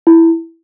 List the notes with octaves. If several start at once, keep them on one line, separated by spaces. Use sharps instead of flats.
E4